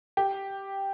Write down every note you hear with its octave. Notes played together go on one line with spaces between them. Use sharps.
G4